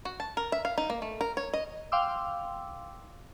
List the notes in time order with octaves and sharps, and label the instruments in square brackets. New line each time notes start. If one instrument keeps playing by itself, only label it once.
[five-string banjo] F#4
A5
A#4
E5
F5
D#4
A#3
A3
A#4
C#5
D#5
[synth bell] F5 G5 C6 D6 E6